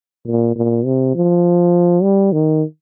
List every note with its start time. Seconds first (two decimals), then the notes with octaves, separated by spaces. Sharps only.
0.27 A#2
0.56 A#2
0.85 C3
1.15 F3
2.02 G3
2.32 D#3